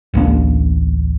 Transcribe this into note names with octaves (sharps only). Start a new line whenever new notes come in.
D1 A1 A#3 D4